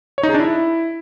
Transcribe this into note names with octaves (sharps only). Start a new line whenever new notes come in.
C#5
D#4
G#4
D4
E4